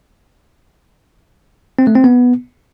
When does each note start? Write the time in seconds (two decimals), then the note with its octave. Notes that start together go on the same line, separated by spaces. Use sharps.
1.79 C4
1.87 A3
1.96 C4
2.04 B3